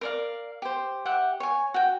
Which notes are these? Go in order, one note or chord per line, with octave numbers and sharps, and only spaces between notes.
A#4 D5 F5
G4 C5
G4 E5 F#5
C#5 G#5
F#4 G5